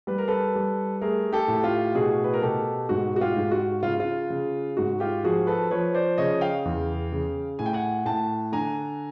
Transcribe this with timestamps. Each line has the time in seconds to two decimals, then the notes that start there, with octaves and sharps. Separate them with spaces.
0.07 G3 B4
0.18 A#4
0.28 A4 B4
0.55 G3
1.01 A3 G#4 A#4
1.32 G4 A4
1.48 A2
1.64 F4 G4
1.95 B2 F#4 G#4
2.24 B4
2.34 A#4
2.42 B2 G4 A4
2.89 G#2 F#4
3.16 F#4
3.20 F4 G4
3.36 G#2
3.51 F#4
3.83 C#3 F4
4.00 F4
4.30 C#3
4.77 G#2 F#4
5.00 F4 G4
5.24 F3 F#4 G#4
5.47 A4 B4
5.71 F3 B4 C#5
5.94 C5 D5
6.18 C#3 C#5 D#5
6.41 F5 G5
6.65 E2
7.12 C#3
7.59 A2 G#5
7.66 G5
7.73 F#5 G#5
8.05 A2 G5 A5
8.52 D3 G#5 A#5